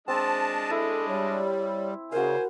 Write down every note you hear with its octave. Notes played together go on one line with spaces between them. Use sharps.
G#3 C4 D4 D#5 A5
E4 A4
G3 C#5
C#3 F#4 A#4 C5 F5 G#5